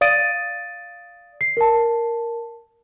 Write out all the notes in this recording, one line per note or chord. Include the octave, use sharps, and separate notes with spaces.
D5 F5 D#6 A6 D7 D#7
C7
A#4 A5